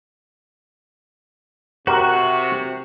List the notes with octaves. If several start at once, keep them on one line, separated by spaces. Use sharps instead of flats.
C3 F#4 G4 A#4 C5